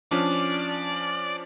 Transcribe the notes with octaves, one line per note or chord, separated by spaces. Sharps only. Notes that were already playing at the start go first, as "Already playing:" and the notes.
F3 C#4 D4 D5